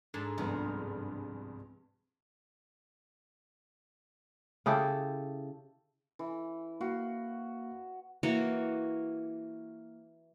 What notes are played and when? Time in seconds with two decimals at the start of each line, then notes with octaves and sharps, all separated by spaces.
0.14 G#2 D4 G#4 A4
0.38 C#2 G2 C3 F3 B3
4.66 C#3 E4 G4 A4
6.19 E3
6.81 A#3 F#4 F5
8.23 E3 A#3 F#4 C#5